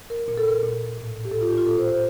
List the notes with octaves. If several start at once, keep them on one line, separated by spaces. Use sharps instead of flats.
A#4
A#2 A#4
A4
A#4
A#2
A2
G4
A2 A4
F4
G4
F4
A#2 A4
C5
C5